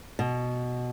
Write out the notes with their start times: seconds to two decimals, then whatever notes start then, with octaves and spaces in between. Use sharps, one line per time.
0.19 B2